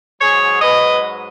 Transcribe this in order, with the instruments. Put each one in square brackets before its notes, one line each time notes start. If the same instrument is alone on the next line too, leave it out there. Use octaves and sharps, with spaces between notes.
[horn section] G#2 F#3 G#4 C#5
B4 D#5